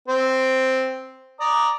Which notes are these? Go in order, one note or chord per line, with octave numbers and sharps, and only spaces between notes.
C4 C5
D5 A#5 D#6